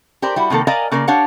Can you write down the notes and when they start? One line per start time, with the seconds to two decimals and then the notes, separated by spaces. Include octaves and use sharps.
0.22 G4 A#4 C5 D5
0.36 G3 E4 F#4
0.50 C3 D#3 A#3 A4
0.67 A#4 D5 D#5 F5 G#5 A#5
0.92 C#3 A#3 A#4 D5
1.08 D4 G4 C#5 F5 F#5